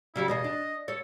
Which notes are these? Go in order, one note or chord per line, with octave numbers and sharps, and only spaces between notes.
C#3 F#3 G3 E4
E2 B2 G#4 D#5
D4
A4 C#5